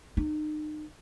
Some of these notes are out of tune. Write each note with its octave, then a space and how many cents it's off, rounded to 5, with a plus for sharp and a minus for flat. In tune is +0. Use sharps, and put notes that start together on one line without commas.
D#4 -35